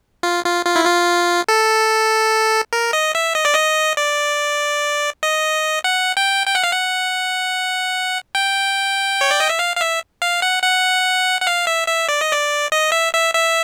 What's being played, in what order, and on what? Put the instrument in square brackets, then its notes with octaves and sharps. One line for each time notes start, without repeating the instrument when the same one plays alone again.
[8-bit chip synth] F4
F4
F4
E4
F4
A4
A#4
D#5
E5
D#5
D5
D#5
D5
D#5
F#5
G5
G5
F#5
F5
F#5
G5
C#5
D5
D#5
E5
F5
F5
E5
F5
F#5
F#5
F#5
F5
E5
E5
D5
D#5
D5
D#5
E5
E5
E5